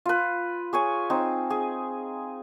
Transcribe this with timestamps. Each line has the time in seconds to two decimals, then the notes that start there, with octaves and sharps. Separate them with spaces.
0.06 F4 B4
0.73 G#4 C#5 G#5
1.10 C4 D#4
1.50 G#4